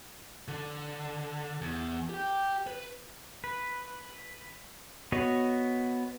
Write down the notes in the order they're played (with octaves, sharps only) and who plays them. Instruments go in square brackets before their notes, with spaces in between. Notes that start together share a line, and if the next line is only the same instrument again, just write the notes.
[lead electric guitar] D3
E2
G4 G5
B4
[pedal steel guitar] B4
B3 F#4 C#5 D#5